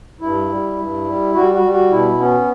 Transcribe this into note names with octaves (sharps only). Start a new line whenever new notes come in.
G2 E4
G3
G2
G3
G3 F#4
F#4
G3
F#4
B2 E4
B3 C#4